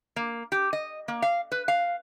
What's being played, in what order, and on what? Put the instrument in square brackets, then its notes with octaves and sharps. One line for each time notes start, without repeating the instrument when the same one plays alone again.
[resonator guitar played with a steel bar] A#3
G4
D#5
A#3
F5
B4
F5